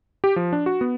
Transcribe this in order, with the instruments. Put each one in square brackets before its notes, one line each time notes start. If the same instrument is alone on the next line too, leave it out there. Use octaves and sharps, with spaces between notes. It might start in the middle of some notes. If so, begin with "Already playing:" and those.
[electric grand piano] G4
F3
D4
F#4
B3